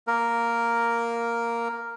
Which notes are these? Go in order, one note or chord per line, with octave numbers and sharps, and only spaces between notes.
A#3 A#4